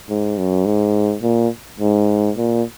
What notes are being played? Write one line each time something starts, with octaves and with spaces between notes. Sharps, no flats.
G#2
F#2
G#2
A#2
G#2
A#2